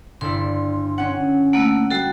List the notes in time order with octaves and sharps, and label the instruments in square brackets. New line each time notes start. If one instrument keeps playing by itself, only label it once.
[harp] G1 D4 E4 [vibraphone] C6
[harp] C#4 F#5
[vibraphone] A3 A#3 E6 [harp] F#5
[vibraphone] G3 F#4 A4